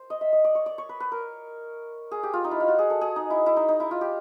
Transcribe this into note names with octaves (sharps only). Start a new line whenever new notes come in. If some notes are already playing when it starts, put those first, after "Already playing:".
Already playing: C5
D#5
E5
D#5
D5
C#5
D5
C#5
B4
B4
A#4
G#4
G4
F4
D#4
E4
F4
F#4
G#4
A4
G#4
D#4
E4
E4
D#4
D#4
E4
F4
G4